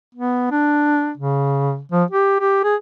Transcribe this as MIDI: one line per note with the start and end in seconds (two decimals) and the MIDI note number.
0.15 0.51 59
0.51 1.12 62
1.17 1.80 49
1.92 2.04 53
2.11 2.37 67
2.40 2.61 67
2.64 2.75 68